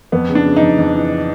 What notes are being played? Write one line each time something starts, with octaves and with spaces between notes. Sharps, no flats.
F2 B3
C#3
D4
C#3
D#4
F2
F2
E3